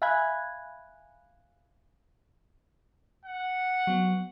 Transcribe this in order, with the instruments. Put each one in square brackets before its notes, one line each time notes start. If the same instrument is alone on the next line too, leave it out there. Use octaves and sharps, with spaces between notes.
[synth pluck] E5 F5 G#5 B5 F#6 G#6
[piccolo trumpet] F#5
[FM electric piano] F#3 B3